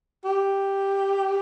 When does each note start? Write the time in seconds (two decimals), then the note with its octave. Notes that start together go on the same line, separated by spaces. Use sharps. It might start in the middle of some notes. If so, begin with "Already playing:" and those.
0.25 G4